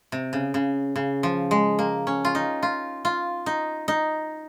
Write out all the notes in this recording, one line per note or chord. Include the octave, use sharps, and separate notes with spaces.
C3
C#3
C#3
C#3
F3
G#3
A#3
C#4
F4
D#4
F4
F4
D#4
D#4